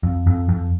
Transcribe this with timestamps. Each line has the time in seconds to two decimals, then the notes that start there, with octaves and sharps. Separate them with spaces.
0.03 F2
0.27 F2
0.49 F2